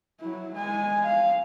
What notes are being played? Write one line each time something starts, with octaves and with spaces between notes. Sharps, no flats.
F#3 E4
G#3 G#5
F5